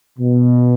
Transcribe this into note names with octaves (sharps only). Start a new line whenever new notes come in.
B2